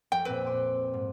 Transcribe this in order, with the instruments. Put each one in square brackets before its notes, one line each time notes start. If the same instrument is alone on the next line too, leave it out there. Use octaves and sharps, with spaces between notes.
[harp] F2 [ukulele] G5
[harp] A#2 C4 [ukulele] B4
[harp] C6 D6
G#2